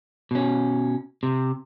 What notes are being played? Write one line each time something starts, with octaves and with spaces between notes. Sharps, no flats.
B2 C#4
C3